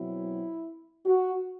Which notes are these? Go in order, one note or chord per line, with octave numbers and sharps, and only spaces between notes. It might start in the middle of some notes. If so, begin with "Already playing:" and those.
Already playing: B2 F#3 C4 E4
F#4